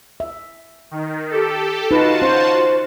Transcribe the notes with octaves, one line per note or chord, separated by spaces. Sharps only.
E5
D#3
G4 A4
D#4 F4 F#4 B4 A5
C#4 C5